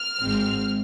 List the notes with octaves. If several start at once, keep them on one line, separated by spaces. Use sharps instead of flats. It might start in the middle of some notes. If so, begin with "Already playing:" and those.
Already playing: F6
G#1 G#2 G#3 C4